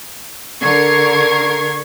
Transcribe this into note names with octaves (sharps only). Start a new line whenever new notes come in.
D3 A#4 C#6 G#6 C7